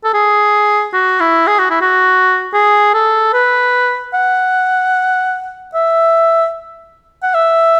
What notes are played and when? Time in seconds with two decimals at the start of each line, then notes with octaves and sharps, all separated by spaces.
0.04 A4
0.14 G#4
0.93 F#4
1.20 E4
1.47 G#4
1.59 F#4
1.70 E4
1.81 F#4
2.53 G#4
2.94 A4
3.33 B4
4.14 F#5
5.74 E5
7.23 F#5
7.34 E5